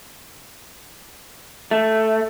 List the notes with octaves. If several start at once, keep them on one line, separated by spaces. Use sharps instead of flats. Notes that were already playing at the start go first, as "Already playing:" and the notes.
A3